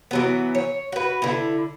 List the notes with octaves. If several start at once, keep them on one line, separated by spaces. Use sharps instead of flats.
E3 F#3 B3
C#5
F#4 B4
D3 E4